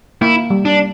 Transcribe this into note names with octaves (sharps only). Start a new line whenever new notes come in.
A#3 E4
G3
D4